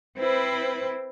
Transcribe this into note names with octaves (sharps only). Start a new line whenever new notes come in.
C4 E4 B4 C5